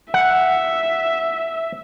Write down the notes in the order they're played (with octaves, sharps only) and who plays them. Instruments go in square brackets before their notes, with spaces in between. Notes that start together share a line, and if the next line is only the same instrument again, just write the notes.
[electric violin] E5 [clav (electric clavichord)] F#5